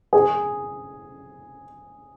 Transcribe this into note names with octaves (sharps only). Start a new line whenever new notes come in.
G#4